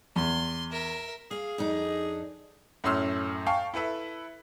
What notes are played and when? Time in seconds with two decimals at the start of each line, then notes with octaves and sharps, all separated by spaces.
0.16 E2 C6
0.71 A#4 E5
1.31 G#4 F5
1.58 F2 D4 D#4
2.84 F#2 A2 C#4 C6 E6 F6
3.46 F5 G5 A5 C#6
3.74 E4 A4 B4 E5